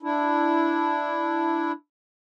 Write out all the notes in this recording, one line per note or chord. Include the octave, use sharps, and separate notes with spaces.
D4 E4